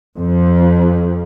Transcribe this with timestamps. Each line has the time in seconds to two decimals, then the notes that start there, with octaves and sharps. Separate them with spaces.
0.18 F2